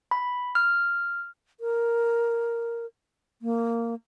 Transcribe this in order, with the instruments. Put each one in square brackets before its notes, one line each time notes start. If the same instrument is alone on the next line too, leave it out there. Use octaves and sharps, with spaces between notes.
[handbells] B5
F6
[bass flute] A#4
A#3